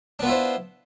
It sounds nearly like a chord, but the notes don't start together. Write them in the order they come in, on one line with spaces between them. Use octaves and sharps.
D4 B3 F4 E4 C5